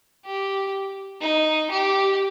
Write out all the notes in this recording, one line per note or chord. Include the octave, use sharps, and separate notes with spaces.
G4
D#4
G4